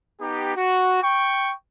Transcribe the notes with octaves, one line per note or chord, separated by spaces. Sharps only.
B3 D#4 G4
F#4
G5 C#6